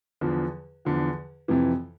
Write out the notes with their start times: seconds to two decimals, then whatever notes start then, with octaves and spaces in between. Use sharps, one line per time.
0.21 E2 D3 F3
0.85 E2 D3 F3
1.48 F2 C3 E3